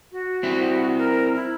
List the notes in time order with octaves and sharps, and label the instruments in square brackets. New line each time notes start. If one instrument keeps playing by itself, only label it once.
[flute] F#4
[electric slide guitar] C4 E4
[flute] A#4
E4